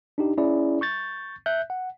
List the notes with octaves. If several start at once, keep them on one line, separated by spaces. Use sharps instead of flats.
D4 D#4 G4
C#4 E4 G#4 D5
C#6 G6 A6
E5 F#6 G6
F#5